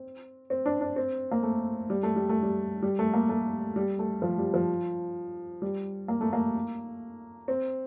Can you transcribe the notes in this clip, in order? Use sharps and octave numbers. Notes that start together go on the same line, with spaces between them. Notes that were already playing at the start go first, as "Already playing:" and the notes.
Already playing: C4
C4
D4
D4
C4
A#3
A3
G3
A3
G3
A3
G3
G3
A3
A#3
A3
G3
A3
F3
G3
F3
G3
A#3
A3
A#3
C4